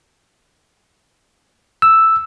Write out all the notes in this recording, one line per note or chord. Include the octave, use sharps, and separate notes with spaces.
E6